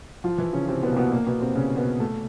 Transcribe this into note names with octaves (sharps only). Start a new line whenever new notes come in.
F3 F4
E3 E4
C#3 C#4
C3 C4
B2 B3
A#3
B2 B3
A#2 A#3
B2 B3
C3 C4
C#3 C#4
B2 B3
A3